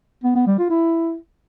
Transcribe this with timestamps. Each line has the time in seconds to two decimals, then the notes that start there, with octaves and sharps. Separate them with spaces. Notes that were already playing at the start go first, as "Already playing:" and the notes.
0.24 B3
0.35 B3
0.47 G3
0.59 F4
0.70 E4